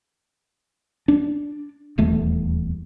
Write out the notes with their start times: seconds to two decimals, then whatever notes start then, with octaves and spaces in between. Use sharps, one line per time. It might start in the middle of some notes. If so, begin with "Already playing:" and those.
1.08 D4
1.98 D#1 E2 A3